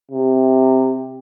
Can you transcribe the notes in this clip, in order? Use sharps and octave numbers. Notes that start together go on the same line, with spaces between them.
C3